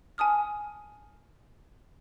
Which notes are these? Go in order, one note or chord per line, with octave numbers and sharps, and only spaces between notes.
G#5 A5 D#6 F6